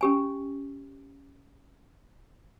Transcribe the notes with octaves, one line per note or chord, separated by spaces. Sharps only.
C#4 G4 G#5